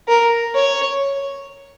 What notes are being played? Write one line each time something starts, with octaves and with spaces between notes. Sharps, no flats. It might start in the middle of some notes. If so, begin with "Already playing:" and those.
A#4
C#5